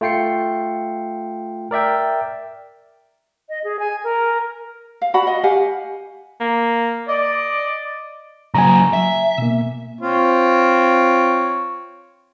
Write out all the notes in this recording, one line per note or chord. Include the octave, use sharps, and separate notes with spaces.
A3 F4 G5 C7 C#7
A#4 D5 E5 G5
D#5
G#4
G#5
A#4
F5
F#4 D5 F#5 B5
D#5
G4 F5 F#5 G#5
A#3
D5 D#5
C#3 F#3 G#5 A#5
E5
B2 A#3
C4 F4 C#5